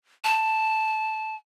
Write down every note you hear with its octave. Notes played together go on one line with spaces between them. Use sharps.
A5